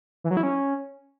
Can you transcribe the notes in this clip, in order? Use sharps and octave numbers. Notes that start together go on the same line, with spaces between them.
E3
F#3
E4
C#4